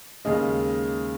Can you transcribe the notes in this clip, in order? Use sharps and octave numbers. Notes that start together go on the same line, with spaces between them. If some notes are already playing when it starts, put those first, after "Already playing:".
D#2 C#3 G#3 D#5